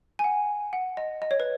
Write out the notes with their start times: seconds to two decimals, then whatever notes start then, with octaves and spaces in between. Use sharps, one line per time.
0.19 G#5
0.24 F#5
0.73 F#5
0.97 D#5
1.22 D#5
1.31 C#5
1.40 B4